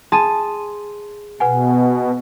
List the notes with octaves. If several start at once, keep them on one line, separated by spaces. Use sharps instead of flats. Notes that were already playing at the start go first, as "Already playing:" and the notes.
G#4 A5 C6 D#7
B2 B4 F#5 G#5